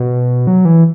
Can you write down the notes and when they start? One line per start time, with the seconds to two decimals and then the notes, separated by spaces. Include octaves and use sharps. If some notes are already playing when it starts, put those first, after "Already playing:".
Already playing: B2
0.47 F#3
0.65 E3